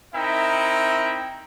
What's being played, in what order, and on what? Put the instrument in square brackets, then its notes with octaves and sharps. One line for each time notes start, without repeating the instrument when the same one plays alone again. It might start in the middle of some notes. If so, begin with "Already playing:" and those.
[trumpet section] C4 D#4 E4 A#4 E5 G5